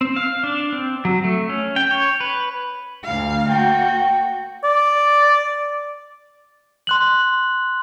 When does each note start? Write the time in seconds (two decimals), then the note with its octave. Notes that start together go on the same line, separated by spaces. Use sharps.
0.01 C4
0.16 F5
0.43 D4
0.73 C4
1.05 F#3
1.24 A3
1.49 C#4
1.76 G5
1.91 C#5
2.20 B4
3.04 D2 F5
3.49 A#3 F#4 G5
4.64 D5
6.87 C6 F#6 F#7